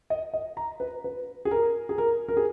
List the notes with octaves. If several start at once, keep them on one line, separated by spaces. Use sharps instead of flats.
D#5
D#5
A#5
B4
B4
G#4
A#4
G#4
A#4
A#4
G#4